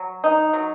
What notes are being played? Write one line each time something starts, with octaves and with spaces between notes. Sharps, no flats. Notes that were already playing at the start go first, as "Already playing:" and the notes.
Already playing: F#3
D#4
F#3